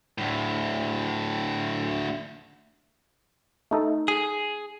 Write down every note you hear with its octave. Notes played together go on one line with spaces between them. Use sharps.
D2 A2
A3 D#4 A4
G#4